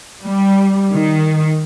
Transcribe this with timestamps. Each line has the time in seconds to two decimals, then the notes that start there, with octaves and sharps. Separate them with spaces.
0.25 G3
0.93 D#3